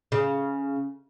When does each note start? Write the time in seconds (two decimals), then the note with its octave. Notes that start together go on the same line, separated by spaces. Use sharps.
0.12 C#3